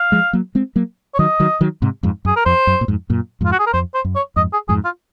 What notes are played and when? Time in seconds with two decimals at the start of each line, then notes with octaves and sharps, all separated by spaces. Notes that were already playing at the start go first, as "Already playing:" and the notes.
Already playing: F5
0.12 F3 G#3
0.33 F#3 A#3
0.55 G#3 C4
0.76 F#3 A#3
1.14 C#5
1.19 D#3 F#3 D#5
1.40 D#3 F#3
1.61 D#3 F#3
1.82 G#2 C3
2.03 F2 G#2
2.25 F#2 G#4
2.36 A#4
2.46 F2 C5
2.67 F#2
2.81 A#2
2.88 F2 G#2
3.10 F#2 A#2
3.41 F2 G#2 F4
3.52 F#4
3.59 G#4
3.67 A#4
3.73 F2 C5
3.94 C5
4.05 F#2
4.16 C#5
4.36 F2 G#2 D#5
4.53 G#4
4.69 F2 G#2 G#4
4.85 F4